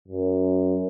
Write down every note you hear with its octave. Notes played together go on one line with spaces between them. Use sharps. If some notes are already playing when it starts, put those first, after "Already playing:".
F#2